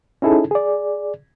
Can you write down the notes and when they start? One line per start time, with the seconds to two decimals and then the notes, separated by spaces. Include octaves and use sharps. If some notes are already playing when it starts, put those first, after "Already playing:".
0.22 C#4 D#4 E4 G#4 A4
0.51 G#4 D5